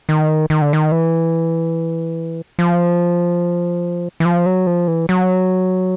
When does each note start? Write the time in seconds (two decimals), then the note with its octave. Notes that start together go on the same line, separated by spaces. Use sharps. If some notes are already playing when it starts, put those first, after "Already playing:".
0.09 D#3
0.50 D#3
0.62 D3
0.73 D#3
0.92 E3
2.59 F3
4.20 E3
4.25 F3
4.46 F#3
4.67 F3
4.88 E3
5.09 F#3